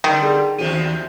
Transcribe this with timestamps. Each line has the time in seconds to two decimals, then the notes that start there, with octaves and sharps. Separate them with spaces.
0.04 D3 D#3 G3
0.22 G#4 A4 D5
0.58 D#2 F3 F#4 G4 A4 D#7